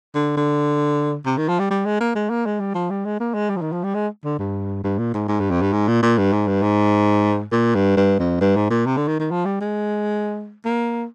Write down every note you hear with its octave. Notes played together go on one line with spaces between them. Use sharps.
D3
D3
C3
D#3
F3
G3
G3
G#3
A#3
G#3
A#3
G#3
G3
F3
G3
G#3
A#3
G#3
G3
F3
D#3
F3
G3
G#3
D3
G2
G2
A#2
G#2
G#2
G2
F2
G2
G#2
A#2
A#2
G2
G#2
G2
G#2
A#2
G2
G2
F2
G2
G#2
A#2
C3
D3
D#3
D#3
F3
G3
G#3
A#3